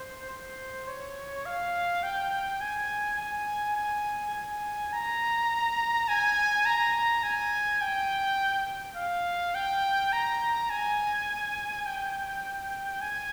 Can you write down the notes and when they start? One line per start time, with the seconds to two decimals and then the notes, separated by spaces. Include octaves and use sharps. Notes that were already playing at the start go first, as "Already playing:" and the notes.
Already playing: C5
0.30 C5
0.88 C#5
1.46 F5
2.03 G5
2.61 G#5
3.19 G#5
3.77 G#5
4.35 G#5
4.93 A#5
6.08 G#5
6.66 A#5
7.23 G#5
7.82 G5
8.97 F5
9.55 G5
10.13 A#5
10.70 G#5
11.86 G5
13.01 G#5